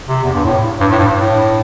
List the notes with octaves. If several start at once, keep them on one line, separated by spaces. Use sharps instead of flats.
C3
E2
G2
A2
G2
A2
G2
A2